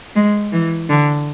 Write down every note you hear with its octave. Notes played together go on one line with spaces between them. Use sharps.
G#3
E3
D3